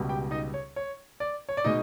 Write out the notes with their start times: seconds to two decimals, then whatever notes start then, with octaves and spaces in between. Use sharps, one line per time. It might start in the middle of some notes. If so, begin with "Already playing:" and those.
Already playing: C#2 B2 G3
0.09 G4 G5
0.31 D#4 D#5
0.54 C#5
0.76 C#5
1.20 D5
1.49 C#5
1.57 D5
1.64 B2 G#3 D#4 D#5